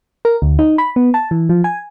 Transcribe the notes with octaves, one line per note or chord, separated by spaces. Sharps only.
A#4
D2
D#4
B5
B3
A5
E3
F3
G#5